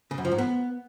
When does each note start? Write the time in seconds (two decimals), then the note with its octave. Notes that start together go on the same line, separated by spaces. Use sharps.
0.11 C#3
0.18 F#2
0.25 F3
0.32 G#2
0.38 B3